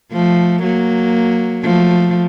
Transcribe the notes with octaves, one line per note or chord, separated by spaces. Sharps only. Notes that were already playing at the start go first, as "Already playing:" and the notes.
F3 A3
F#3 A#3
F3 A3